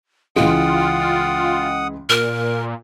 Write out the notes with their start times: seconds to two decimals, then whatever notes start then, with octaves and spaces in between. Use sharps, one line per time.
0.36 C#2 E3 G#3 F4 F#5 G5 D#6
2.09 A#2 A#4